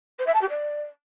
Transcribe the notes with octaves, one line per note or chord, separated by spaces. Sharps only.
C5
E5
A5
G4
D5